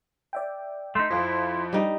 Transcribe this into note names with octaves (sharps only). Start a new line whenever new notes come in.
D5 E5 G5
A3 D#4 C6 B6
F2 F3 E4
G3 D#4